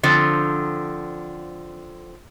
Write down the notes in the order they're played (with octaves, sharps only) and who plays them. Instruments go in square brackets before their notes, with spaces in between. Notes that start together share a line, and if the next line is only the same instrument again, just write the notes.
[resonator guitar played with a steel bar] D3 F3 C4